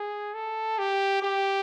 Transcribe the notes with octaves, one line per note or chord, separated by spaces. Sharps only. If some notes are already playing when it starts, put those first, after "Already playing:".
Already playing: G#4
A4
G4
G4